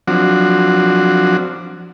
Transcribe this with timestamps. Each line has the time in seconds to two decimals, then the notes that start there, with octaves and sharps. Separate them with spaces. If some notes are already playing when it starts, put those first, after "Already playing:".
0.08 F3 F#3 C4 D4 F#4